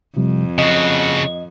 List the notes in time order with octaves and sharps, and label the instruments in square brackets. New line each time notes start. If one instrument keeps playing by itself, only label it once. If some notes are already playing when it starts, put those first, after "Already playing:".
[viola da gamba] F2 [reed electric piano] C3 F3 G3
[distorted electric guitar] C#3 F#4 [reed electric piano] D#5